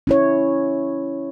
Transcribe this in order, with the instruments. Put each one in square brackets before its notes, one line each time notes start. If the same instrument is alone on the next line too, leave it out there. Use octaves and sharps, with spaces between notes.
[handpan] C#4 E4 C#5